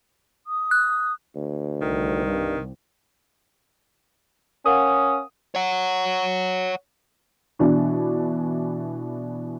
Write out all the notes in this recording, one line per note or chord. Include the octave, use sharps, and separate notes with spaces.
D#6
F#6
D2
C2 D#3
G2
C#4 A#4 F5 F#5 D#6
C#5 F#5
B2 E3 D4